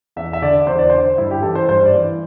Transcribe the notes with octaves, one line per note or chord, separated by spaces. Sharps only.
E2 E5
E5
D3 D5
E2 C5
D5
D3 C5
G2 E4
G4
E3 A4
C5
G2 C5
D5
E3